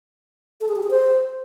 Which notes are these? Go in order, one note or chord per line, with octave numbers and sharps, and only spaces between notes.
A4
G#4
G4
G#4
C5